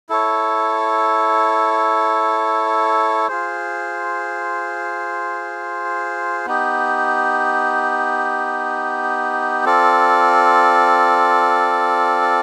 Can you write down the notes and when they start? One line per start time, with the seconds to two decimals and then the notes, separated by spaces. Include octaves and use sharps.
0.09 E4 A4 C#5
3.28 F4 G#4 C5
6.46 B3 D#4 G4
9.65 C4 F4 A4 D5